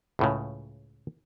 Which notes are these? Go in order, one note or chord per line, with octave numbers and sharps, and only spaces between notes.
C#2 A2 C#3